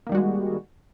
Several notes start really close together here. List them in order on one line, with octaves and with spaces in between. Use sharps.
A#3 D#3 G3 F#4 G#3